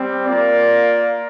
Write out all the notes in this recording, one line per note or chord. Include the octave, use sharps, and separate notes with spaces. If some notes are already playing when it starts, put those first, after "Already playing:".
Already playing: G3 C4
A#3 F4 A#4 D5